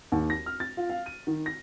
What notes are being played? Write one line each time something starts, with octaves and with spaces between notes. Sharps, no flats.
D#2
A#6
F6
A6
F4
F5
D#7
D#3
A#6